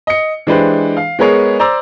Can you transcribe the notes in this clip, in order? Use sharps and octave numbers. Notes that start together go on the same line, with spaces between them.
D#5 C#7
E3 G#3 D4 G4 B4 C5
F5
G#3 B3 G#4 A#4 C#5
C5 D5 A#5 D6 E6